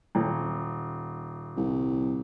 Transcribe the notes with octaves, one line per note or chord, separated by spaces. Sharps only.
D#1
C2